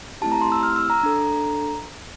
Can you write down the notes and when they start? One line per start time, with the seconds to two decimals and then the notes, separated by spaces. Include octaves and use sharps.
0.21 A3 C4 E4 G4 A5
0.32 A#5
0.41 C6
0.52 E6
0.63 F6
0.76 E6
0.90 A#5
1.03 D4 A4